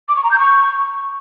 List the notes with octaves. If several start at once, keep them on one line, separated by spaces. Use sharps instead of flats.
D6
C#6
A#5
G6
C#6